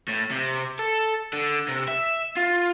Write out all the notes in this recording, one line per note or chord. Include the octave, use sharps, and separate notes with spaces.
A2
C3
A4
D3
C3
E5
F4